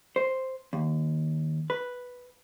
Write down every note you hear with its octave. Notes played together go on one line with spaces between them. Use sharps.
C5
D#2
B4